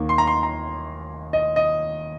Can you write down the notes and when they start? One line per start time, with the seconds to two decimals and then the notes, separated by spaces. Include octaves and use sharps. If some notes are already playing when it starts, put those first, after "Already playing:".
Already playing: D#2 D#3 A#3
0.09 C6
0.18 A#5
0.27 C6
0.43 A#5
1.33 D#5
1.56 D#5